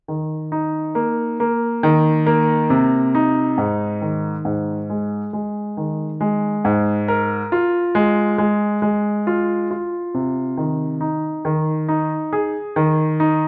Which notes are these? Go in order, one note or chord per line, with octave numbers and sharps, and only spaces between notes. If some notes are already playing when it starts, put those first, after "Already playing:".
D#3
D#4
A#3
A#3
D#3
A#3
C3
D#4
G#2
D#3
G#2
G#3
G#3
D#3
G#3
G#2
A#4
F4
G#3
G#3
G#3
F4
F4
C3
D#3
D#4
D#3
D#4
G#4
D#3
D#4